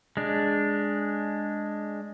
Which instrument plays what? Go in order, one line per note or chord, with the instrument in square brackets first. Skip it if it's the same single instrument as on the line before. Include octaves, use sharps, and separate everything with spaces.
[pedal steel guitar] G#3 D4